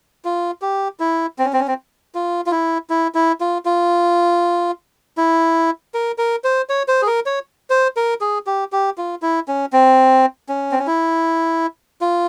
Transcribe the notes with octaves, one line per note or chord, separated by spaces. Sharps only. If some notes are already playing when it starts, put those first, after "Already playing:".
F4
G4
E4
C4
C#4
C4
C#4
C4
F4
F4
E4
E4
E4
F4
F4
E4
A#4
A#4
C5
C#5
C5
G#4
A#4
C#5
C5
A#4
G#4
G4
G4
F4
E4
C#4
C4
C#4
C4
C#4
E4
F4